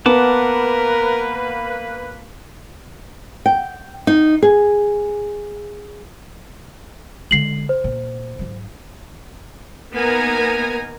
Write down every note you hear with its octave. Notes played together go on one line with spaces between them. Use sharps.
A#3 B3 A#4 B4 F#5 A5 D6
G5
D#4
G#4
D3 G#3 C7 F#7
C5
A#2
G#2 F#3
A#3 B3 D#4 A#4 G#5 A#5